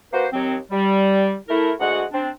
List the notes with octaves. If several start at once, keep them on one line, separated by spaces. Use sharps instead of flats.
A#3 F#4 B4 C5
D#2 F#3 C4
G3
A3 E4 A#4
D2 G#3 F#4 F#5
C4 D4